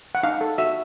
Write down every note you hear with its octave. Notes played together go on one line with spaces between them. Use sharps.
F#5
D#4 F5
A4
F#4 E5